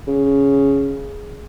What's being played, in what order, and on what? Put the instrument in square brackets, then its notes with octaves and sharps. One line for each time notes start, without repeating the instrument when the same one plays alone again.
[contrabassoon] C#3